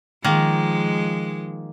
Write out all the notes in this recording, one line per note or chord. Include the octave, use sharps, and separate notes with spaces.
D#3 F3 G#3 A#3